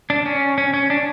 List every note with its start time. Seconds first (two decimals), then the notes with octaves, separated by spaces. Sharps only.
0.10 D4
0.26 C#4
0.58 C#4
0.74 C#4
0.90 D4